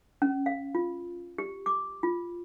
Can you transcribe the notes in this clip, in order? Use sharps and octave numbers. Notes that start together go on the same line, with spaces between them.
C#4
F5
F4
G4
D6
F4